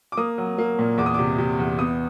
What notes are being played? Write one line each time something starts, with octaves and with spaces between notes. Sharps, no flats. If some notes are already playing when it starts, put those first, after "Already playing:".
D6
A#3 D#6
F#3
A#3
A#2
E2 D6
D#6
C3 D6
C3
E2
B3 D#6